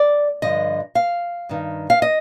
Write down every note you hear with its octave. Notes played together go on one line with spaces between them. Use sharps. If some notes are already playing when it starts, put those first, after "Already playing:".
Already playing: D5
G2 D3 F3 D#5
F5
G2 D#3
F5
D#5